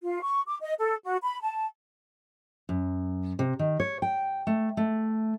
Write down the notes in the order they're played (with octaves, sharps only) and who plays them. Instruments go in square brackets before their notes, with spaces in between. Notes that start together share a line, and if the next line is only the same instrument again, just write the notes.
[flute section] F4
C#6
D6
D#5
A4
F#4
B5
A5
[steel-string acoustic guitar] F#2
C3
D#3
C#5
G5
A3
A3